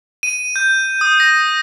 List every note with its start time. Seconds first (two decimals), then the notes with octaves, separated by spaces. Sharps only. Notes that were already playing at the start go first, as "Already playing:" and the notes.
0.23 D#7
0.56 G6
1.01 D#6
1.20 A#6